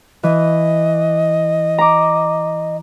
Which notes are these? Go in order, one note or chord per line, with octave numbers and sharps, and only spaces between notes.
E3 D#5
A#5 D6